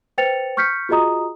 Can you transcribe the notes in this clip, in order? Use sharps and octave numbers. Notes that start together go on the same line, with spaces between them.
B4 C5 G5 A6 C#7 F7
C#6 F6 G6 B6 C#7
F4 F#4 G#4 D#5 A#5 D#6